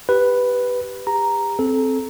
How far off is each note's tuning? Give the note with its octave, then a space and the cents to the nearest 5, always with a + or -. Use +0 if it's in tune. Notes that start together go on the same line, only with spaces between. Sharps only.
G4 +0 B4 +0
G4 +35 A#5 +0
C4 +0 A4 -20